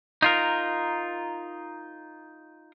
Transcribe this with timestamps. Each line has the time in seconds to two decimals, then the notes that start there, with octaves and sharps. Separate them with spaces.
0.22 D#4 F4 A#4